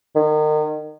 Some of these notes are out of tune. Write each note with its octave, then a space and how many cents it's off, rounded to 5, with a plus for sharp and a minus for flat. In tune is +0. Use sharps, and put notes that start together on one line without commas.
D#3 -30